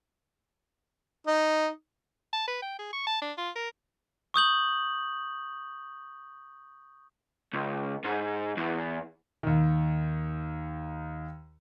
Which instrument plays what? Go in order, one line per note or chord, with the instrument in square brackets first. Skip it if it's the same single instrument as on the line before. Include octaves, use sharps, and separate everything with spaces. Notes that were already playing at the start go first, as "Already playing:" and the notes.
[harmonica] D#4
[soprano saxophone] A5
B4
G5
G#4
C#6
A5
D4
F4
A#4
[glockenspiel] C#6 D#6 G6 F#7
[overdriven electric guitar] C#2
G#2
E2
[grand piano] D#2 D#3